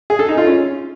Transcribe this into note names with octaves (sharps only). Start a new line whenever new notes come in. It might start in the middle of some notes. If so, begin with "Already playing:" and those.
G#4
A4
D#4
F4
C#4